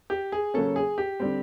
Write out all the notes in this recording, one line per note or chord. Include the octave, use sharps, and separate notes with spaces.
G4
G#4
C#3 F#3 A#3 C#4 A4
G#4
G4
D3 G3 C4